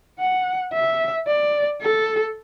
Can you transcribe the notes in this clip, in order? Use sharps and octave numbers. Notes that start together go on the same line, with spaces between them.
F#5
E5
D5
A4